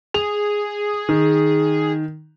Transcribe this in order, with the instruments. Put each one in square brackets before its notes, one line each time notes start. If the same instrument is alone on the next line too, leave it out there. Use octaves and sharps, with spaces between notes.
[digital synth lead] G#4 [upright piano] F7
[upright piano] D#3